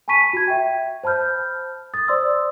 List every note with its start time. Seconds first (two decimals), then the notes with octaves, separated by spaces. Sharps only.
0.08 G#5 A5 B5 C#6 B6 D#7
0.33 F#4 G#6
0.48 E5 G5
1.04 C5 A5 B5 F6 G6
1.94 D#6 A6
2.08 C5 D5 C6 D#6 E6